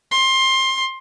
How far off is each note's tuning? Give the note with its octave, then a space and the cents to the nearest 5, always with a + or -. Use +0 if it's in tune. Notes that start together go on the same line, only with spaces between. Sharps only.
C6 +20